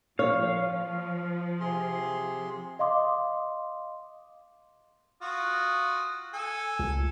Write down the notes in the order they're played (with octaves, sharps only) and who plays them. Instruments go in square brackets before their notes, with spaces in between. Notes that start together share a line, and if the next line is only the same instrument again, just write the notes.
[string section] F3 [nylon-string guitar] C#5 [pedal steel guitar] F5
[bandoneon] C3 G#4 C6
[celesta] D#5 F5 C6 D6 D#6
[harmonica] F4 F#4 D#6
A4 G#5
[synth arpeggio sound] C#2